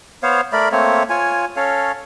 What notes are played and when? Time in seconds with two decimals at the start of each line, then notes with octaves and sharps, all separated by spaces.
0.23 B3 C5 C#5 F5
0.53 A3 A#4 D5 B5
0.72 A3 A#3 C4 C#5
1.10 F4 C#5 G#5
1.56 C#4 A4 C#5 F5